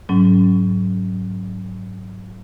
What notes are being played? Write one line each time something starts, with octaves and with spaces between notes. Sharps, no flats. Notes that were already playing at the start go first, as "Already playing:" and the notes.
G#2 F#3 C#4